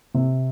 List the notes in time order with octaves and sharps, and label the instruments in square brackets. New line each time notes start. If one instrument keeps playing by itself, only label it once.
[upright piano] C3